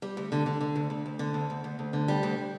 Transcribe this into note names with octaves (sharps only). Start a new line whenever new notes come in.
G3
D2
D3
D3
D3
D2
D2
D2
D3
D2
D2
D2
D2
D3
G3
D2